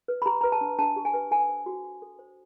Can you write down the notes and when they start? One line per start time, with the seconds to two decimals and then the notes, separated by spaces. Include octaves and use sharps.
0.08 B4
0.22 B5
0.26 G4 A#5
0.41 B4 A#5
0.52 A5
0.61 D4
0.79 D4 A5
0.96 G4
1.05 G#5
1.14 B4
1.31 A4 G#5
1.49 C5
1.66 F#4
1.84 F#4
2.02 A4
2.19 C5